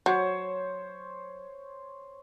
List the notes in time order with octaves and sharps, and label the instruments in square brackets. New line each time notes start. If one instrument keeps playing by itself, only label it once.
[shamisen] F#3 [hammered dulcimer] C5 C#5